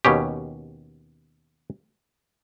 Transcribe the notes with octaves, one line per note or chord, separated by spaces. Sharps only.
D#2 B2 C#4 G4